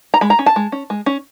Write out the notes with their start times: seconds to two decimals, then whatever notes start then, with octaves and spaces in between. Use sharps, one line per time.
0.14 A#5
0.21 G#3 B5
0.30 A#5
0.39 C#4
0.46 A5
0.56 G#3
0.72 C#4
0.90 G#3
1.06 C#4